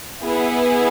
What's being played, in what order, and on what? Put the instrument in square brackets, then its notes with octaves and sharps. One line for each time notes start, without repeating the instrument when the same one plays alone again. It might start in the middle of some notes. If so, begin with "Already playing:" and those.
[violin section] B3 E4 G#4